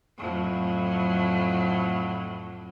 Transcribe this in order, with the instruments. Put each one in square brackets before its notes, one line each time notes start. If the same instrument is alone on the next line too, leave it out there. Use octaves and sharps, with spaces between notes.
[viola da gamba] F2 A2 F#3